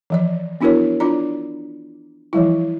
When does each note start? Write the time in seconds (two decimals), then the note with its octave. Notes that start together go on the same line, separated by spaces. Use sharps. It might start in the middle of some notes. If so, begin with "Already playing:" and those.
0.10 E3 F3 D5
0.61 B3 D4 E4 F#4 A#4 C#5
1.00 D4 F4 D5 A#5
2.33 E3 F3 G3 E4